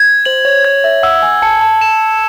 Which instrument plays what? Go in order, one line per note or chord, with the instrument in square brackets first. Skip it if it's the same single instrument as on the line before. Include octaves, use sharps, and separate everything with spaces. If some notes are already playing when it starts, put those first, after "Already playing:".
Already playing: [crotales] G#6
[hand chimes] C5 [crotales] F#7
[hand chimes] C#5
[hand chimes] C#5 [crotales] G#6
[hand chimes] E5
[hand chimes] F#5 [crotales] E6
[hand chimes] G#5
[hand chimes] A5 [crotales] C#7
[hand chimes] A5
[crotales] E7